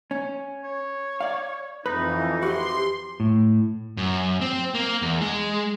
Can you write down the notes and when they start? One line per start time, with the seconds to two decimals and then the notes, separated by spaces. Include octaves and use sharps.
0.11 C#4
0.63 C#5
1.20 D5 F5
1.86 F2 E3 D#4 B4 B5
2.43 F#4 G4 B4 C6
3.20 A2
3.97 F#2
4.41 C4
4.75 A#3
5.02 E2
5.21 G#3